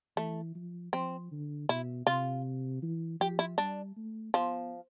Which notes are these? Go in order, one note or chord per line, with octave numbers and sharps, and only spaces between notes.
E3 A3
F3
F3 C4
D3
B2 E4
C3 F4
E3
F3 G4
E4
G3 D4
A3
F3 B3